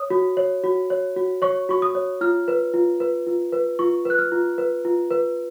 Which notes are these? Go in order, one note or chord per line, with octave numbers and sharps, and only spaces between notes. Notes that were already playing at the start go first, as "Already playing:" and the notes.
Already playing: C#5 D#6
F#4
C#5
F#4
C#5
F#4
C#5 C#6
F#4 C#6
D#6
C#5
F4 F6
B4
F4
B4
F4
B4
F4 C#6
B4 F#6
F6
F4
B4
F4
B4